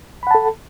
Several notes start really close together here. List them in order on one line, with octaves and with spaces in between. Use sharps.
B5 F#5 A5 A4